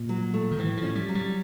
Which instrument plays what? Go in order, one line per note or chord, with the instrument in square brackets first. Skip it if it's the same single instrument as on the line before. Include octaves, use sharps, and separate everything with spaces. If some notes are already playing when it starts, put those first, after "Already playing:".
Already playing: [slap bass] A#2
[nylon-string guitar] F#3
A3
[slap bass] D#3
[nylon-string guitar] A2 [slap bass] E3
[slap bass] F3
[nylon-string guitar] C#4
[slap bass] G3
[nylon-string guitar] F#3
[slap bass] G3